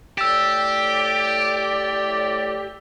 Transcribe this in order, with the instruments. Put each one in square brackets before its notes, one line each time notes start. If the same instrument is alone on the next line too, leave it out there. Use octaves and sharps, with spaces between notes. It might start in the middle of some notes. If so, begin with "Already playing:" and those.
[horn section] A2 D5 [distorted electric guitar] G4 [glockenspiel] E6 E7